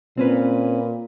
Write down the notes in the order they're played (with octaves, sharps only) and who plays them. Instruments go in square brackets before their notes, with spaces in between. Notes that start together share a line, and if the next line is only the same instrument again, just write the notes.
[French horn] A#2 [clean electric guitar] C4 C#4 B4